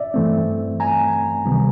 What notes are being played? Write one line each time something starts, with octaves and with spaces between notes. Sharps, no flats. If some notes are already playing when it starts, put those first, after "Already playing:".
Already playing: D5 E5
G2 E3 A3 C4
G#5 A#5
C#2 C3 D#3 G3 B3